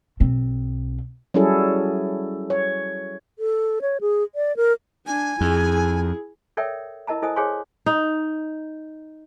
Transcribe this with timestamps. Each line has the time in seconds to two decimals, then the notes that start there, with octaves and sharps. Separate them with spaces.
0.20 B1 C4
1.34 F#3 G3 C#4 E4 G#4 A4
2.50 C#5
3.39 A4
3.82 C#5
4.01 G#4
4.35 D5
4.57 A#4
5.07 D4 G#5
5.41 F2 E4 G#4
6.57 A4 A#4 C#5 D5 E5 G5
7.07 E4 A#4 D#5 A5 A#5
7.22 E4 A4 C5 D#5 G#5 D#6
7.36 G#4 C5 C#5 F5 G#5 C6
7.86 D#4